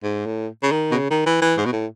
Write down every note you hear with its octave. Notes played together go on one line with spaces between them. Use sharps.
G#2
A2
C#3
D#3
B2
C#3
D#3
E3
E3
G#2
B2
A2